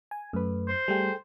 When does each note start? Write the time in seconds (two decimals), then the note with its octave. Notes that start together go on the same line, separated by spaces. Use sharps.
0.11 G#5
0.33 F#2 A3 B4
0.68 C5
0.88 G3 A3 G#4 A4 G5